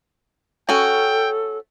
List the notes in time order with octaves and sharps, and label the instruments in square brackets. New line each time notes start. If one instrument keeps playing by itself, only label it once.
[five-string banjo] C#4 F#4 [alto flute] A4 [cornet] G5